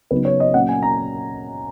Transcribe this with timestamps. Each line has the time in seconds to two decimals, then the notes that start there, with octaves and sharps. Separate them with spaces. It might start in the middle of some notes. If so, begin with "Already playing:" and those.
0.11 C#3 F#3 B3 D#4 B4
0.25 C#5
0.40 D#5
0.54 A#2 F#3 C#4 F#5
0.68 G#5
0.83 A#5